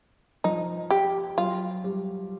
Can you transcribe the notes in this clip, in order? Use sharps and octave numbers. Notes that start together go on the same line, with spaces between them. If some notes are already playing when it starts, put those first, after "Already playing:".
F3 D#4
G4
F#3 F4
G3